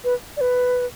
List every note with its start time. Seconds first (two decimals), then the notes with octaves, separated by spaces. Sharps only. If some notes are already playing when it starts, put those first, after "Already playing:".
0.04 B4
0.37 D5
0.41 B4